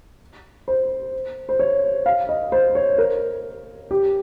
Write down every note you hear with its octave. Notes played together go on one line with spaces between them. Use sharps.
C5
C5
C#5
F5
D#5
C5
C#5
A#4
G4